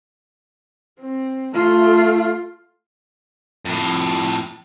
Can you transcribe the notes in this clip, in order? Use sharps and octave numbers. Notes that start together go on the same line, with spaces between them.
C4
A3 F4
F2 A2